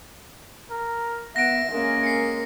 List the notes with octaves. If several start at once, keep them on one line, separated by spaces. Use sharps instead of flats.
A#4
B3 E5 F#5 A#6 D7
G#3 A#3 C#4 A#4
C7 C#7